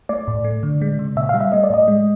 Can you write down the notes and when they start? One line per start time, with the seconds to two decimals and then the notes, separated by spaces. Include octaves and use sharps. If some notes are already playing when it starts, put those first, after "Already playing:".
0.09 A3 D5
0.28 A2
0.44 A3
0.63 D3
0.81 G#3
0.99 C#3
1.16 A#2 E5
1.29 G3 F5
1.41 E5
1.52 A3 D#5
1.64 D5
1.70 A2 D#5
1.88 G#3